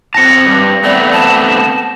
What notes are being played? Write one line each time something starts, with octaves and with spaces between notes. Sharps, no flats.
C4 A5 A#6 C#7
G2
A3 B3 C4 D5
A5